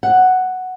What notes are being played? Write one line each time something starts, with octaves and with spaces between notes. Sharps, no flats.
F#5